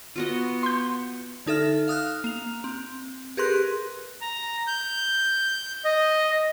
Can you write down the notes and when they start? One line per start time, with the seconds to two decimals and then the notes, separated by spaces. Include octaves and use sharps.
0.16 B3 F4 F#4 D#5
0.63 C6 G6
1.46 D3 D#4 A4 E5 F6
1.88 F5 D#6 F6 F#6
2.24 A#3 F7
2.64 C4
3.37 G4 G#4 A#4 B4 C6 F#6
4.21 A#5
4.67 G6
5.85 D#5